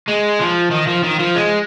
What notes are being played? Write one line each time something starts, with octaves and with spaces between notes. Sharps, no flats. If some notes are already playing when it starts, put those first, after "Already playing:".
G#3
F3
D#3
F3
D#3
F3
G#3